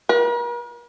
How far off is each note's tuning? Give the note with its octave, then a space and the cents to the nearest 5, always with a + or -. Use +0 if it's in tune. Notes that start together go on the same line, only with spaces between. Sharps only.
A#4 +45